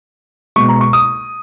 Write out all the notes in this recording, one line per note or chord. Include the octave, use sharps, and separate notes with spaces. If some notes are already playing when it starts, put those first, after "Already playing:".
B2 G#3 C#6
A#5
C#6
D#6